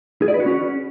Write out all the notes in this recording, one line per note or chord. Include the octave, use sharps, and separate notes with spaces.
G#4
D5
B4
F#4
C#4